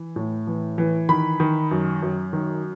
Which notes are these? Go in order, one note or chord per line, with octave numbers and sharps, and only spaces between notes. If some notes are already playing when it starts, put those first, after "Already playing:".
Already playing: E3
A2
E3
E3
D#3 B5
D#3
F#2
F#2
D#3